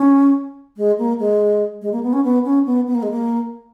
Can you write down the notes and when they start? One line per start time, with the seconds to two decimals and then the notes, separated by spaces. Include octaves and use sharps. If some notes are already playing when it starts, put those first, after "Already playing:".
Already playing: C#4
0.77 G#3
0.98 A#3
1.19 G#3
1.82 G#3
1.92 A#3
2.03 B3
2.13 C#4
2.24 B3
2.45 C#4
2.66 B3
2.87 B3
2.95 A#3
3.03 G#3
3.11 A#3